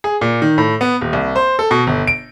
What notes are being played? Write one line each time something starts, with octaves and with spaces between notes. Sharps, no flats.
G#4
A#2
D#3
A2
B3
D#1
C2
C5
A4
B2
G1
D7